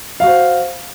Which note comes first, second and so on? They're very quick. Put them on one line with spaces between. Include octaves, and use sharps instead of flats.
F5 F#4 C5